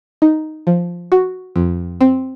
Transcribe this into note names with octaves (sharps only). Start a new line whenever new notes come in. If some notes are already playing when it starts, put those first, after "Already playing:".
D#4
F3
F#4
F2
C4